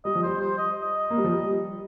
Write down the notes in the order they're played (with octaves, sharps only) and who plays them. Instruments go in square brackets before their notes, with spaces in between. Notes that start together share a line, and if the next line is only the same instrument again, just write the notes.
[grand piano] G3 [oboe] D#5
[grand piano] F3
[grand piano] G3 [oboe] C5
[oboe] C5
D#5
D#5
[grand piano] A#3
G3
F3
G3